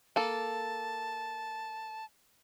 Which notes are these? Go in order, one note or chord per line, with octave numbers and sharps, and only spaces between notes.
A#3 A4 A5